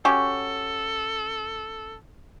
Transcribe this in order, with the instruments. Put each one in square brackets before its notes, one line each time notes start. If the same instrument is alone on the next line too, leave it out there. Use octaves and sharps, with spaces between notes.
[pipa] C#4 F#4 G4 [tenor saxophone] A4